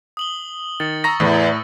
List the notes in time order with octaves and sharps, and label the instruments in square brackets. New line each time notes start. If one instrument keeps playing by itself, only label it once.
[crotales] D#6 F#7 G7
[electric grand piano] D#3 [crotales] A6 C#7
[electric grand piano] A#5 A#6 [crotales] C#6 E6
[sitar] E2 [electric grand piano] A2